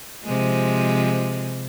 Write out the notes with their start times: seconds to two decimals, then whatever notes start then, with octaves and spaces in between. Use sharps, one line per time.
0.25 C3 F3 G#3